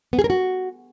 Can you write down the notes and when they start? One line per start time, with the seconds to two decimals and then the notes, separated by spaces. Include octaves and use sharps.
0.13 B3
0.19 G#4
0.24 A#4
0.30 F#4